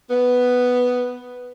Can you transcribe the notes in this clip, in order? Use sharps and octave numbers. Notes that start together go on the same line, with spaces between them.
B3